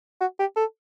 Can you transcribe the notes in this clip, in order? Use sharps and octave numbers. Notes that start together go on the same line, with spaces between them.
F#4
G4
A4